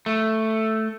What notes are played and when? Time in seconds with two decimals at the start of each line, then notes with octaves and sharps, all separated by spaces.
0.06 A3